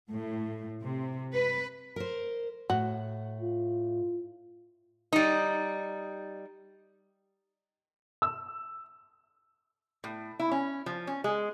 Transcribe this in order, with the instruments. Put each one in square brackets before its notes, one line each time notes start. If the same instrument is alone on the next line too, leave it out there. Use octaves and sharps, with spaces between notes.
[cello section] A2
C3
B4
[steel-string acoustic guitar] A#4 C5
[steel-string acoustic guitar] A2 [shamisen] F#4
[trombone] F4
[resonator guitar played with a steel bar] G3 D#4
[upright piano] E6
[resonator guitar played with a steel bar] A2
E4
C#4
F3
C#4
G#3